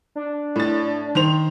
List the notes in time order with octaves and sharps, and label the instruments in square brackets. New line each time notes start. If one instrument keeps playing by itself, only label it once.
[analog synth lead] D4
[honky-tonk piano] A2 A6
D#3 C5 F7